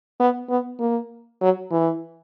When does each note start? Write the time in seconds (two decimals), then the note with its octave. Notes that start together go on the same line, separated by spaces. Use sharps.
0.20 B3
0.50 B3
0.80 A#3
1.41 F#3
1.71 E3